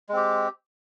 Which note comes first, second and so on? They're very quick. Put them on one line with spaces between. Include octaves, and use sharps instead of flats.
G#3 C4 G4